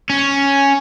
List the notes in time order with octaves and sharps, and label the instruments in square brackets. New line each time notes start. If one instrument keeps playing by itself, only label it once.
[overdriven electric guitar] C#4